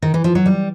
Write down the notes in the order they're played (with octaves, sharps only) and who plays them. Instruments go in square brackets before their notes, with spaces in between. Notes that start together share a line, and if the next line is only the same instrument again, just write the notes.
[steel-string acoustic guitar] D#3
E3
F3
F#3
G3